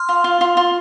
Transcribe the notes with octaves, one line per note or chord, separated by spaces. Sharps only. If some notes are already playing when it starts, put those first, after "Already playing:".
Already playing: C6 F6
F4
F4
F4
F4